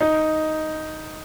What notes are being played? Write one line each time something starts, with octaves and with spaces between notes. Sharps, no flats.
D#4